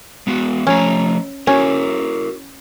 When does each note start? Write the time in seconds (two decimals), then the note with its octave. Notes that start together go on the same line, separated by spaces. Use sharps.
0.27 G#3 B3 F#4
0.67 F3 A3 C#4 A#5
1.47 C#4 E4 F#4 A#4